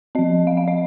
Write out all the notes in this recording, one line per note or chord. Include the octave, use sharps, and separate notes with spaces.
F3 C4 D#5
F5
F5
D#5